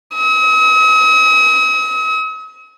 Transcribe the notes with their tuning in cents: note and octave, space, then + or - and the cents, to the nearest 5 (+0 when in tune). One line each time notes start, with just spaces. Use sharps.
D#6 +45